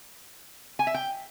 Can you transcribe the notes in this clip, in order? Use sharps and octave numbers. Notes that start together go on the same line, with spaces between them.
G#5
E5
G5